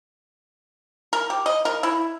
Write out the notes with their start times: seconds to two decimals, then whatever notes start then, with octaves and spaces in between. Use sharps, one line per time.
1.13 A#4
1.30 G4
1.46 D#5
1.65 A#4
1.83 E4